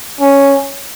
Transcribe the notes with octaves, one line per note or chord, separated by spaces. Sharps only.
C#4